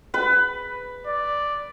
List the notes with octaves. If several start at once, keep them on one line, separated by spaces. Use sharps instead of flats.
B4 B5
D5